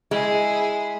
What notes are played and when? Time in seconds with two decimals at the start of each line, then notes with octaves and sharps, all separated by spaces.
0.11 G#3 E4 G#4